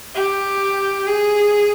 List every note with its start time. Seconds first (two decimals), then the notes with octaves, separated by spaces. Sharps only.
0.15 G4
1.07 G#4